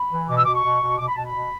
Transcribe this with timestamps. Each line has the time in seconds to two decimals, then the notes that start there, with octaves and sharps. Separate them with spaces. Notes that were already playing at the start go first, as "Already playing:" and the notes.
Already playing: B5
0.10 E3
0.28 B2 D6
0.37 E6
0.45 B2 D6
0.55 C#6
0.63 B2
0.81 B2
0.98 B2 D6
1.08 B5
1.16 B2 A5
1.25 B5
1.34 B2